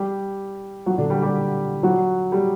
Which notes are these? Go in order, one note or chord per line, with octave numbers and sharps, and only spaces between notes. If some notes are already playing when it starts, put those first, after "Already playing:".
Already playing: G3 G4
F#3 F#4
D3 D4
G3 G4
G3 G4
F#3 F#4
G3 G4